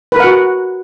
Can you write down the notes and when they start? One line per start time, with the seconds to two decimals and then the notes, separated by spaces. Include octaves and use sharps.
0.12 B4
0.16 A#4
0.20 F#5
0.24 F#4